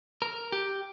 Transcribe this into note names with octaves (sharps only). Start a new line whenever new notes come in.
A#4
G4